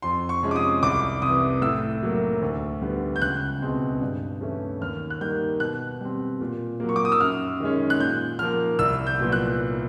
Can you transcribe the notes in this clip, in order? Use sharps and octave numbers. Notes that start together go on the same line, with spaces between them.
F2 C6
C#6
C3 F3 G#3 C#4
D6
D#6
C2 D6
C3 D#6
E3
A2 E6
F#3 A#3
D2
D3 G3 B3
G6
C#2 F#6
B2 G#3 C4
G2
E3 A3 C#4
D#2 F6
F#6
D#3 G3 A#3 G6
B2 F#6
G3 C4
A#2
F#3 A#3
C#6
D6
D#6
E6
F#2 F6
D#3 G#3 C#4
F#6
A#2 G6
F3 A#3 F6
C2 E6
G6
A#2 F#3 B3
F#6